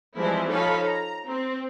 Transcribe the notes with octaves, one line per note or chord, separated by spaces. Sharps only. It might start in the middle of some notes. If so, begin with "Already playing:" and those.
E3 F3 G3 G#3 C4 E4
F3 D#4 A4 C#5 F5 B5
A#5
C4